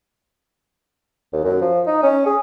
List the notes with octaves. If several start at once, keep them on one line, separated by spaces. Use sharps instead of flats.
D#2
F#2
F3
D#4
C#4
G#4